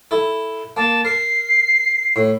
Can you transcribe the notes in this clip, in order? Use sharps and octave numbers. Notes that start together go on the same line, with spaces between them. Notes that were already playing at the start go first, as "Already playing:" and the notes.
E4 A4
A#3 A5
A#4 C7
A2